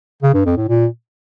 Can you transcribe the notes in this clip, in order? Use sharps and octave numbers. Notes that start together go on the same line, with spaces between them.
C#3
G2
F2
A2
A#2